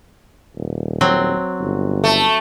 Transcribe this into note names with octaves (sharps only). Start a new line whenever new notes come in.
D#1
F#3 C4
G1
A3